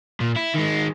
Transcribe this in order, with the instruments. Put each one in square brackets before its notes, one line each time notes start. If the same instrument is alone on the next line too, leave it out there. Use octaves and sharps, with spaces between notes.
[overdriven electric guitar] A#2
E4
D#3 G#3